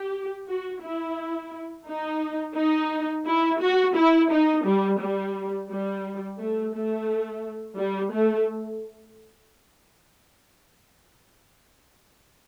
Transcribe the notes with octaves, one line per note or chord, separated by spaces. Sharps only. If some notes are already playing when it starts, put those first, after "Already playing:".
Already playing: G4
F#4
E4
D#4
D#4
E4
F#4
E4
D#4
G3
G3
G3
A3
A3
G3
A3